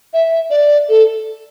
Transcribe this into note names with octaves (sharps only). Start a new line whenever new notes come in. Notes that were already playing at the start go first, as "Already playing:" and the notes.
E5
D5
A4